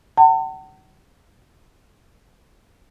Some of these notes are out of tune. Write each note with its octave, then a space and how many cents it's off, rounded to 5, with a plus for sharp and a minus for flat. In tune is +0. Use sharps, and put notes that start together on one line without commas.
F#5 +45 A5 +45